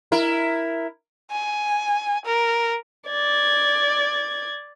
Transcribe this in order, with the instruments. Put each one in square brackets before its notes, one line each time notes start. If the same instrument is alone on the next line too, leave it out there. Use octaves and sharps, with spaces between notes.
[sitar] E4 A#4
[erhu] G#5
A#4
[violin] D5 G#6